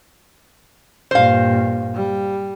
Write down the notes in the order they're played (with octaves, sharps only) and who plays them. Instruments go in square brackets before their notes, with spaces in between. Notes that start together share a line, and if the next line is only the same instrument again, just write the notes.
[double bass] G2 A#2 [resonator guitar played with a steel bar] C5 F5
[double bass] G3